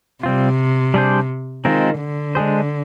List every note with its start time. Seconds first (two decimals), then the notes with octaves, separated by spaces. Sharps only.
0.23 C3 G3 C4 F4
0.94 G3 D4 G#4 C5
1.65 D#3 G#3 C4 F4 A#4
2.00 D3
2.35 G#3 D4 G#4 C5